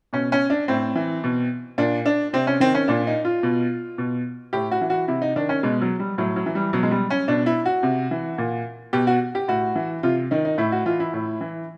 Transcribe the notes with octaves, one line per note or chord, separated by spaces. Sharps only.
B2 C#4
C#4
D4
A2 C4
E3
B2
A#2 D4
D4
C3 C4
C#4
D#3 C4
C#4
A#2 D4
D#4
F4
B2
B2
A2 G4
F#4
E3
F#4
C3 E4
D#4
D#3 D4
C#4
B2 G#3
F#3
G3
A2 F#3
F#3
E3
G3
B2 F#3
G#3
G3
C#4
B2 D4
E4
F#4
C3
E3
A#2
B2 G4
F#4
G4
A2 F#4
E3
C3 F4
D#3 D#4
D#4
A2 E4
F#4
E3 F4
E4
A2
E3